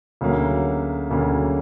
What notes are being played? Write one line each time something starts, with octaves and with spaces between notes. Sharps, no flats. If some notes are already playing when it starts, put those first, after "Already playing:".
D2 C#3 F#3 A#3
D2 C#3 F#3 A#3